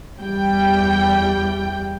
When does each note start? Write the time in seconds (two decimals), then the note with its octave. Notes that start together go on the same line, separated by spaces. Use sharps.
0.21 E2 G3 G5